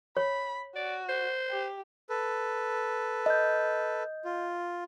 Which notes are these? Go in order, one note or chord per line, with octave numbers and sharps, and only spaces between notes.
C#5 B5
F#4 D5
C5
G4
A4 B4
D#5 G6
F4